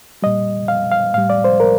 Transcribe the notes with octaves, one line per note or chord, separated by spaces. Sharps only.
A#2 G3 D#5
F5
F5
A2 G3 F5
D5
C5
A#4